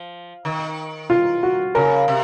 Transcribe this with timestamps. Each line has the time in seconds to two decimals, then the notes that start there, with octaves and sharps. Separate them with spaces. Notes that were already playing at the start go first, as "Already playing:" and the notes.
Already playing: F3
0.45 D#3
1.10 F4
1.43 F#4
1.75 C#3 A#4
2.08 C3